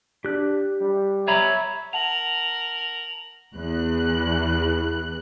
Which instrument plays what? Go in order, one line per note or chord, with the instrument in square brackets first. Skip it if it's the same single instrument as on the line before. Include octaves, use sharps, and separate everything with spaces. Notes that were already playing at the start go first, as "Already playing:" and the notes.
[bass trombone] D4 [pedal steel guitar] G4 F#6
[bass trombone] G3
[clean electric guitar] C#5 A#5 B5 [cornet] E5
[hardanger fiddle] A#4 [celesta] F#5 A5 [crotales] F7 F#7
[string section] E2 F#6